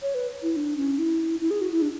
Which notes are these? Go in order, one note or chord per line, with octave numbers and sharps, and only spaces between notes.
C#5
B4
E4
D4
C#4
E4
E4
G#4
F#4
E4
D4